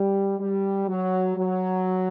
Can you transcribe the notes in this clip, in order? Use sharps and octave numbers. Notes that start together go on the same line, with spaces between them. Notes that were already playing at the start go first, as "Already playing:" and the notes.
Already playing: G3
G3
F#3
F#3